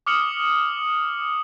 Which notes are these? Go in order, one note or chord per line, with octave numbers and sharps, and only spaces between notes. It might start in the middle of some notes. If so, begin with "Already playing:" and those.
D6 D#6 F6 C#7 F#7